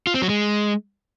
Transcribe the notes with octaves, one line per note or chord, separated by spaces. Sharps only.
F4
C4
F#3
G#3